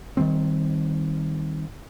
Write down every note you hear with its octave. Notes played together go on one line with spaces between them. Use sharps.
D#3 F3 G3 C4